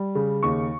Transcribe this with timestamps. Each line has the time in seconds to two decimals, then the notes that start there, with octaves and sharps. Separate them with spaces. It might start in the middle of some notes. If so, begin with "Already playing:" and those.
Already playing: G3
0.15 C#3
0.43 D#2 C#6